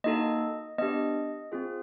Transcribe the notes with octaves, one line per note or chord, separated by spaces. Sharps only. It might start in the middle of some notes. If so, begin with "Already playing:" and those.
A#3 D#4 F#4 A4 D#5
B3 D4 G4 D#5
C4 F4 G#4